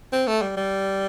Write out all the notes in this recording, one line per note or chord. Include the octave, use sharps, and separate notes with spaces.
C4
A3
G3
G3